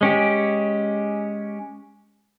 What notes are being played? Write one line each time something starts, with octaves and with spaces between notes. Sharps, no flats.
G#3 C#4 G4